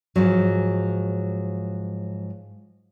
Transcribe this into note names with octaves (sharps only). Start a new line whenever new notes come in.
G#2 F3 F#3